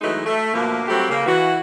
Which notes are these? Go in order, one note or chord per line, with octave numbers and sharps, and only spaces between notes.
E3 F#3 G#3 A3 D#4
A3
B2 D3 F3 A3 A#3
F#3 G3 A3 C4 F#4 G4
C#3 A#3
E3 F#4